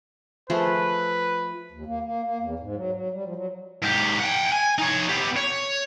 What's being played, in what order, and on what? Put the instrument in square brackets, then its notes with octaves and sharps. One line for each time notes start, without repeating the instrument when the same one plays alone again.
[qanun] F3 A3 G#4 [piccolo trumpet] B4
[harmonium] D#2
A#3
A#3
A#3
E2
G#2
F#3
F#3
G3
F3
F#3
[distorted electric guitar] G#2 G4
F#5 G5
G#5
D#4 C#5
B3 G4
C#5